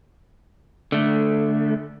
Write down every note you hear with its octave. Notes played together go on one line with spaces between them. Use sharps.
D3 A3